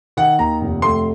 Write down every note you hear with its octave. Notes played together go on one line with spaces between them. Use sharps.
D#3 F#5
D#2 A#5
F1
A3 C6